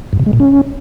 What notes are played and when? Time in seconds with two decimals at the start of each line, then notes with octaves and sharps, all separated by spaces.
0.13 G2
0.19 C3
0.26 G#3
0.33 A#2
0.40 C#4